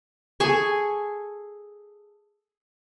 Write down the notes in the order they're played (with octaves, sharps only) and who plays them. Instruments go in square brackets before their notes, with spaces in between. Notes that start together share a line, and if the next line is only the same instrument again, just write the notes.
[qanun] G#4 A4 G#5 C#6